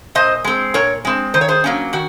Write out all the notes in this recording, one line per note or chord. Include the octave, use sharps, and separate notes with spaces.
A#2 C5 D#5
G#3 C4
A#2 A#4 C#5
G#3 C4
D#3 C5
C#5
G#4 C5
F#3 A#3 C#4
D#3 F#4